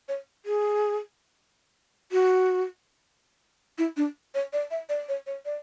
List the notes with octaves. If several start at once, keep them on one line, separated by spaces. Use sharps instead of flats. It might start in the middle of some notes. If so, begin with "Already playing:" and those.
C#5
G#4
F#4
E4
D4
C#5
D5
E5
D5
C#5
C#5
D5